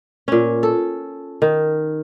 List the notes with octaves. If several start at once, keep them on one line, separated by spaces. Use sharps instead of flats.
A#2 C#4
A4
D#3